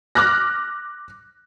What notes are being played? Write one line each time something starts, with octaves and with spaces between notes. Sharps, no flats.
D6 F6 F#6 A#6